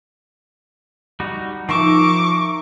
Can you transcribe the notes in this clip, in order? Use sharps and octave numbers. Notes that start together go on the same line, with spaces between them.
G3 D#4 F#4
F3 D#4 A#4 E5 C#6 D6